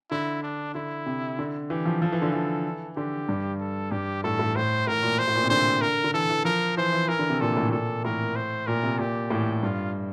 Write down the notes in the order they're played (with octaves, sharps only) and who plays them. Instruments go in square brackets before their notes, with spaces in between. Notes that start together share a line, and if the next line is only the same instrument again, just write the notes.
[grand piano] D3 [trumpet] E4
[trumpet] D4
[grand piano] D3 [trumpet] E4
[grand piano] C3
D3
[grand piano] E3 [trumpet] G4
[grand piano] F3
[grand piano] F3 [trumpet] A4
[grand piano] E3
D3
E3
[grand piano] D3 [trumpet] G4
[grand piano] G2
[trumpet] A4
[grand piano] G2 [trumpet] G4
[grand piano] A2 [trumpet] A4
[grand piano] A2
[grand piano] A2 [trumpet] C5
[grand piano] A2 [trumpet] A#4
[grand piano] A#2
[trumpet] C5
[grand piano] A2
A#2
C3
[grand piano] D3 [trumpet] C5
[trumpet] A#4
[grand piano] D3
[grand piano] E3 [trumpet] A4
[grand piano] E3
[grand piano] F3 [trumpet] A#4
[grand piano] E3 [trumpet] C5
[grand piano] E3
[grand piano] E3 [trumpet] A#4
[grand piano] D3
C3
[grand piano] A#2 [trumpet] A4
[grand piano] A2
[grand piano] A#2 [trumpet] A4
[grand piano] A2 [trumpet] A#4
[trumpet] C5
[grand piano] A#2 [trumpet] A#4
[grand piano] C3
[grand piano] A#2 [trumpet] G4
[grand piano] A2
[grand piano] G2 [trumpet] F4